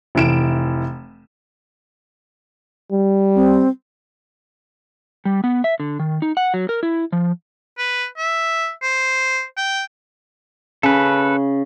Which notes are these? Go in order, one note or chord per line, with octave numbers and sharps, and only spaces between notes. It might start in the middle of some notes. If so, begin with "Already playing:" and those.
F1 E3 D7 E7
G3
C4
G3
B3
E5
D3
D#3
D#4
F#5
F#3
A#4
E4
F3
B4
E5
C5
G5
C#3 A4 B4